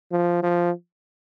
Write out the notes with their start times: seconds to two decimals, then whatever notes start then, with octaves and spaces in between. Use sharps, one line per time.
0.11 F3
0.43 F3